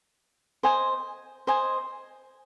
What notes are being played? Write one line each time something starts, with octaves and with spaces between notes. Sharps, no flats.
C5 D#5 G#5
C5 D#5 G#5